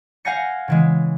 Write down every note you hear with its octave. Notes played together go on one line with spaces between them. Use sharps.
F5 F#5 G#5 G6 A#6 C#7
C#3 E3 G#3